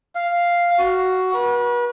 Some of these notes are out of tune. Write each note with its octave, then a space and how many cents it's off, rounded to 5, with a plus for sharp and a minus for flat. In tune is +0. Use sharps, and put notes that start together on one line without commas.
F5 +0
F#4 +10
B4 -40